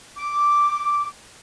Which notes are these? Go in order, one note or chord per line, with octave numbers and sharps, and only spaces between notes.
D6